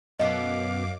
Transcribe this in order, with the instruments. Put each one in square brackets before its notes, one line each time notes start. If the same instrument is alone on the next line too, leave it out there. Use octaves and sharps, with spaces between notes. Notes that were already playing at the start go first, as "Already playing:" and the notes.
[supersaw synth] F#2 D6 [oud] B2 B3 A4 [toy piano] D#5 [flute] F5